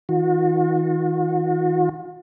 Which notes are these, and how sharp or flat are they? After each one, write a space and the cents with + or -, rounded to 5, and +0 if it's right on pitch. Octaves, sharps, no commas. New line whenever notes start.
D#3 +45 F#4 -45